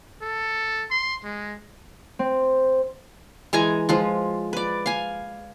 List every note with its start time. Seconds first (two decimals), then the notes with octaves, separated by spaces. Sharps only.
0.22 A4
0.91 C6
1.23 G#3
2.19 C4
3.53 E3 G#3 G#5 A#5
3.89 F3 G#3 F4
4.53 B4 D5
4.86 F5 G#5